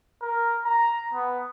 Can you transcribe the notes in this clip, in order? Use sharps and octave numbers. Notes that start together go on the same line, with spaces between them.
A#4
A#5
B3